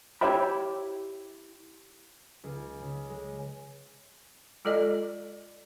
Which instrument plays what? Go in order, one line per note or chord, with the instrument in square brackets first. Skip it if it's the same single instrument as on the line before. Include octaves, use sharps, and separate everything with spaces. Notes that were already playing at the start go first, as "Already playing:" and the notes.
[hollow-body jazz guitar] E4 G4 C#5 E5 G5 B5
[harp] C#2
C#3
G#3
[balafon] G#3 F4 A4 D5 D#5